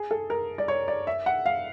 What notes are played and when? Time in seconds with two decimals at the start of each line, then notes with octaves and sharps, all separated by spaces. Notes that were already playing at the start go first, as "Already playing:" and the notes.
Already playing: G#4
0.11 A4
0.30 A#4
0.58 D5
0.68 C#5
0.88 D5
1.07 E5
1.26 F#5
1.46 F5